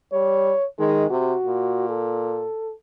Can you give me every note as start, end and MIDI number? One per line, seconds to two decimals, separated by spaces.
0.13 0.53 55
0.13 0.65 73
0.79 1.06 51
0.79 1.05 56
1.10 1.33 48
1.10 1.87 66
1.46 2.46 46
1.89 2.73 69